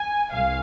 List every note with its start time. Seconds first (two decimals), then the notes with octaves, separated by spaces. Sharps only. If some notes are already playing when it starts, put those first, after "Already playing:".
Already playing: G#5
0.32 C2 F5